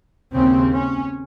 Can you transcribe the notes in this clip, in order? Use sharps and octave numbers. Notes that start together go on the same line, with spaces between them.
D#2 C#3 C4
C#4